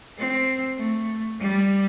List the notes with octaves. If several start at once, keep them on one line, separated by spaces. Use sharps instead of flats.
C4
A3
G3